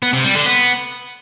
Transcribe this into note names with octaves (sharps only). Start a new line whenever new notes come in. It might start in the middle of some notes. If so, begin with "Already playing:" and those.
B3
C3
G3
D3
B3